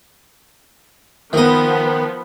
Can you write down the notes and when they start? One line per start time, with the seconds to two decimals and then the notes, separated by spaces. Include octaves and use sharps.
1.33 D#3 F3 B3 D#5